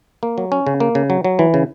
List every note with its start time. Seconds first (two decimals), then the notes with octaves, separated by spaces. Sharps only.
0.23 A#3
0.38 F#3
0.52 C#4
0.67 C#3
0.80 A#3
0.95 C#3
1.10 F#3
1.24 F#3
1.39 E3
1.54 C#3